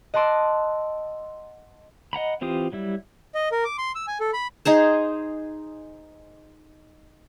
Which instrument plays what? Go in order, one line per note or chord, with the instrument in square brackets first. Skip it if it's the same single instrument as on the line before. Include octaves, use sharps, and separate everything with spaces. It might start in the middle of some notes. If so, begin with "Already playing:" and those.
[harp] D#5 F#5 A5 C6 D6 E6
[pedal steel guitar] D#5 F#5 A#5 B5
E3 C4 F4 G4 D#6
F#3 G3 E4
[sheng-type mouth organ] D#5
A#4
D6
C6
E6
G#5
A4
B5
[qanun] D#4 G#4 C5